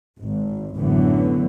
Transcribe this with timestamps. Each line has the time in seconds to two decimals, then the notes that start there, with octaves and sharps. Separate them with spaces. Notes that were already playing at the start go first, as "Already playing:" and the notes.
0.20 G#1
0.76 A1 F#2 D3 E3 F#3 B3